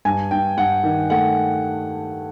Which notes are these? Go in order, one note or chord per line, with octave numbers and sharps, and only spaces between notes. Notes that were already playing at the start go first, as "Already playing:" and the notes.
G2 G#5
G2 G5
G2 F#5
D#3
A3 F#5